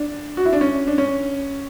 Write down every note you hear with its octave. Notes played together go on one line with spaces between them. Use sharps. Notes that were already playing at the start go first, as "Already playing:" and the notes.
Already playing: D4
F#4
E4
D4
C#4
D4
C#4